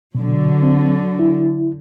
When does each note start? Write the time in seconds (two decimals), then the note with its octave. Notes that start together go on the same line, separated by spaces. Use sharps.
0.15 B2 D3 F#3
0.62 C4
1.19 E4